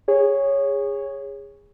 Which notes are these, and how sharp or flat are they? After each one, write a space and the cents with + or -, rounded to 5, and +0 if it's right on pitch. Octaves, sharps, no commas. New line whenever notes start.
G#4 -25 C#5 +0